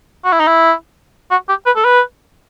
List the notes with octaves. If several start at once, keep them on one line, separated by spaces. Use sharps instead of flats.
F#4
E4
D#4
E4
F#4
G4
B4
A4
B4